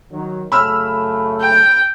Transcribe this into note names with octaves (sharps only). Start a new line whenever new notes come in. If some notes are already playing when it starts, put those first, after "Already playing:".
D#3 F#3
F#2 C#3 A3 B5 E6 F6
G5